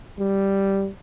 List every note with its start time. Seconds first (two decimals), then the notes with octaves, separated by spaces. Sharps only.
0.20 G3